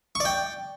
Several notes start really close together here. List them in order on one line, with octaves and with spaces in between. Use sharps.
C#6 D5 G5